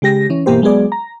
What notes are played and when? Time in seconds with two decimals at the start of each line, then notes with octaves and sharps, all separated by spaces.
0.02 C#3 G#3 G4 A#6
0.30 E3 C#4
0.46 G1 B2 E3 A#3 G4 C5
0.62 F#3 G#3 B3 G#4 D5
0.92 A#5